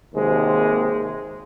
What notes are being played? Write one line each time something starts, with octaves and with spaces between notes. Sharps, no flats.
G#1 D#2 C3 G#3 C5